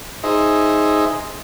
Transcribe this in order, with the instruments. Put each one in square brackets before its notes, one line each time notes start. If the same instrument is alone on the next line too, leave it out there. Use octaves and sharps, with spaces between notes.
[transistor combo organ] D#4 G#4 C5 D#5 E5